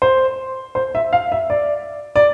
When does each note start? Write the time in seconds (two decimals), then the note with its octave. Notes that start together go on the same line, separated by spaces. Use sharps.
0.02 C5
0.75 C5
0.95 E5
1.13 F5
1.32 E5
1.50 D5
2.16 D5